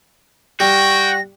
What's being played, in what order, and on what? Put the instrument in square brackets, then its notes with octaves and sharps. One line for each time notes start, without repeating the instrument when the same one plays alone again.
[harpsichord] G3 [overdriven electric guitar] F#4 [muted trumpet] G5 [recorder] A#6